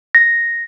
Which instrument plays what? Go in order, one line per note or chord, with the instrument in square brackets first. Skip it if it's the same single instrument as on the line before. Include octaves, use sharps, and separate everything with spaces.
[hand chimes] A#6